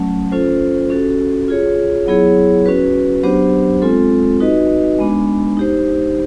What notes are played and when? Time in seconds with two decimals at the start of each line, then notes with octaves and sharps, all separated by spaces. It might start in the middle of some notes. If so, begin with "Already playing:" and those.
Already playing: F#3 A3 C#4
0.32 C#4 F4 A4 C5
0.90 C#4 F#4 A4
1.48 F4 G#4 C#5
2.07 F#3 B3 E4 G#4 C#5
2.66 C#4 F#4 B4
3.23 F#3 B3 D4 G4 C5
3.82 G#3 C4 F4 A4
4.40 D#4 F#4 B4 D#5
4.99 G#3 B3 D4
5.57 D#4 G4 C5